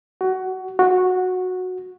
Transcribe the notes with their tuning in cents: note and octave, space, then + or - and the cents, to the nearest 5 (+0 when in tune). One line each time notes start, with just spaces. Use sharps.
F#4 +20
F#4 -10